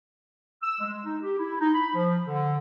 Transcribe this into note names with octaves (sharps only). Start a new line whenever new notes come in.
E6
G#3
D#4
G4
E4
D#4
B5
F3
D3